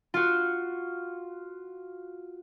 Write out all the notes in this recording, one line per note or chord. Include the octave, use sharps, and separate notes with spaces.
F4 F#4